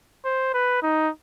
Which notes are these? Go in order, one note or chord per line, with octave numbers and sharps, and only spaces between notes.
C5
B4
D#4